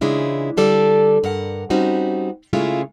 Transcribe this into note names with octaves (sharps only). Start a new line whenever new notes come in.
C#3 E3 G#3 D4 E4 F4
D3 G3 A4 D5
G2 A#4 F#5
G3 C4 C#4 D#4 F#4
C#3 G#3 A3 C#4 E4 F4